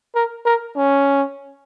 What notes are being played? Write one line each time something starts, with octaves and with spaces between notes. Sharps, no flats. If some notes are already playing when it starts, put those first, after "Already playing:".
A#4
A#4
C#4